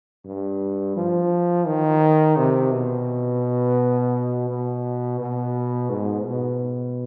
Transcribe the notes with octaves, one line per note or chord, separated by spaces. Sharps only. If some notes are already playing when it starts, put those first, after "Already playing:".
G2
F3
D#3
C3
B2
B2
B2
G#2
B2